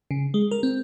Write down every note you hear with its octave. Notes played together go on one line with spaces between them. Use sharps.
C#3
G#3
A#4
C4